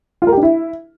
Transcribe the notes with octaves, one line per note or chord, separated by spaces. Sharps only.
F4
A#4
G4
D4
E4